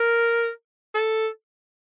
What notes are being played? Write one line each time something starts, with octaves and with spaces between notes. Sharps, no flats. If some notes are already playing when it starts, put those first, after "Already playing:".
Already playing: A#4
A4